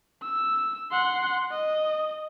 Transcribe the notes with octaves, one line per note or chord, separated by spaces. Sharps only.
E6
F#5 C6
D#5